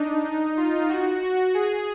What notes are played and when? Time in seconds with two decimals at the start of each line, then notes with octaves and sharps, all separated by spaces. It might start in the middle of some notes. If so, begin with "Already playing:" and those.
Already playing: D4 D#4
0.25 D#4
0.57 F4
0.89 F#4
1.22 F#4
1.55 G#4